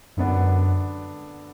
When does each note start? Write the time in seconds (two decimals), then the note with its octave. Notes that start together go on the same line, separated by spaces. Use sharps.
0.17 F#2 D3 B3 D4